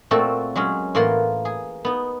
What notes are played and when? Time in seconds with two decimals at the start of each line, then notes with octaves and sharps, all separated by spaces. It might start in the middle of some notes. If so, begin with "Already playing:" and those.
0.11 A#2 A3 C4 F#4 A4
0.55 F#3 G#3 C#4
0.95 A2 E3 A#3 F4 F#5 C6
1.45 G#4
1.85 B3 D#4